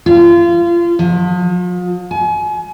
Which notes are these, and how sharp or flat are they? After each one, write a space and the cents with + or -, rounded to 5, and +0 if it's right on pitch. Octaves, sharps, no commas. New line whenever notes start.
F4 -30
F3 +40
G#5 +35